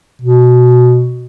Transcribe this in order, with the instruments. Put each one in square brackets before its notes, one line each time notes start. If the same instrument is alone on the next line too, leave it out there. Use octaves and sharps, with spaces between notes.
[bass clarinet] B2